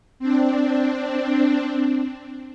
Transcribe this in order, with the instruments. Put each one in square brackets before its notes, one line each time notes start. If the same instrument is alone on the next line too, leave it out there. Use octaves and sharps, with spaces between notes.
[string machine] C4 D4